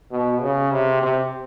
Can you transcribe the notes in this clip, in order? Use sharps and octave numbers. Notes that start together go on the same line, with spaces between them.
B2
C#3
C3
C3